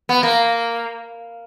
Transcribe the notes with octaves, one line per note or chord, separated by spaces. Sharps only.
B3
A#3